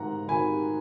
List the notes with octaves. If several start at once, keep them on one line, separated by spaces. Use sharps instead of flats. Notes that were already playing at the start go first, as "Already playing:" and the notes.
Already playing: G#2 D#3 F#5 A#5
D#3 G#5 B5